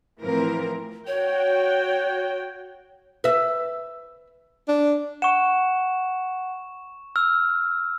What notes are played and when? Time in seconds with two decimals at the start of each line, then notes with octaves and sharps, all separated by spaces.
0.21 A2 E3 F3 C4 A#4
1.07 F#4 C#5 G5
3.24 B4 E5
4.68 D4
5.22 F#5 C#6 E7
7.16 E6 F6